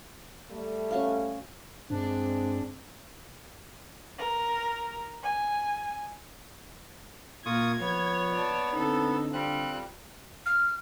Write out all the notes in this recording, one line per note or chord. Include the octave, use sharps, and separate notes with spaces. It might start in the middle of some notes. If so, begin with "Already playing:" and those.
G3 A3
C#4 F#4 F5
G2 G#3 C4 D4
A#4
G#5
A#2 A#3 F4 C#6 D#6 G#6
F3 B3 C#5
D5 A5
D3 C4 D#4 A4
G3 C4 F4 F#6
F6